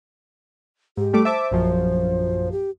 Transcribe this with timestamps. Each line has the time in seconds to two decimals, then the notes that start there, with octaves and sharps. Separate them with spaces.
0.97 G#2 G4
1.13 G3 A3 D6
1.25 C5 E5 A5 D6
1.51 A#1 F#2 F3
2.52 G4